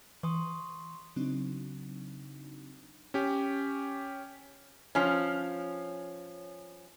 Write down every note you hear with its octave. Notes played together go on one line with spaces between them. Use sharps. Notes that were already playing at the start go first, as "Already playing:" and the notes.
E3 C6 C#6 D#6
C#3 F#3 C4 D4 D#4
C#4 G4
F3 C#4